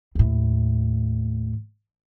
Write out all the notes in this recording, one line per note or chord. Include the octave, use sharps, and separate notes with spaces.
D#2 A2